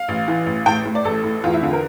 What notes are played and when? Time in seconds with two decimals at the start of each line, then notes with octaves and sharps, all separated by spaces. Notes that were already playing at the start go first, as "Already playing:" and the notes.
Already playing: F5
0.08 A1
0.28 E3
0.46 A1
0.66 A2 G5
0.85 A2
0.95 D5
1.05 A1 A4
1.24 A2
1.44 E2 F4
1.54 E4
1.63 D3 F4
1.73 A#4